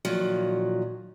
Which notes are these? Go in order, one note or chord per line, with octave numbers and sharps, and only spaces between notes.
A#2 D#3 F3 F#3